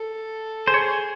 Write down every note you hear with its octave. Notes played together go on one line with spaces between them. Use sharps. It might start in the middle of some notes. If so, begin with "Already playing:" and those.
Already playing: A4
G#4 C5
C#5
C5